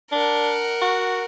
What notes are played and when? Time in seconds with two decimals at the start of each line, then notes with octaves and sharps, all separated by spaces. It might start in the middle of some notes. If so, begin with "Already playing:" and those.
0.12 D4 A#4 F#5
0.82 F#4